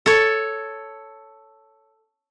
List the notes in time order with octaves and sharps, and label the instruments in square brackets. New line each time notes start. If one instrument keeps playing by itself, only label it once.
[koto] A4 C#5